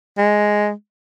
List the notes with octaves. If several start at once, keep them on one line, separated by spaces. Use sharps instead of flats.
G#3